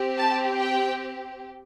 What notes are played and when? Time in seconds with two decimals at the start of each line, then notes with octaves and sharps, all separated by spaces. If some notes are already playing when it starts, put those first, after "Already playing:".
Already playing: C4 G4
0.18 A5
0.61 G5